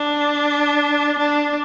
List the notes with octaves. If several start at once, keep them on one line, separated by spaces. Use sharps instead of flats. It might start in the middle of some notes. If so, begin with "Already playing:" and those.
Already playing: D4
D4